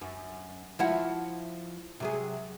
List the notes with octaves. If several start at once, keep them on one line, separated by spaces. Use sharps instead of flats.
F#2
F3 E4 F#4
C3 F#3 G#4